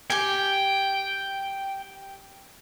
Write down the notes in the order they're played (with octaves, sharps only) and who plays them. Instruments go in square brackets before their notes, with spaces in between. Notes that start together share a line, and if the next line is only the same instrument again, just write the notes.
[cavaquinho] G4 G#5 [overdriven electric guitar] G5